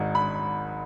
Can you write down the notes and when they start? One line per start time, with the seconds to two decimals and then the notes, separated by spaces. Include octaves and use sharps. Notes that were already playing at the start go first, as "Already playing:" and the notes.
Already playing: G#1 G#2 D#3
0.15 B5